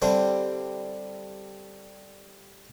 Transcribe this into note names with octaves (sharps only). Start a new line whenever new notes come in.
D3 G3 C4 D4 E4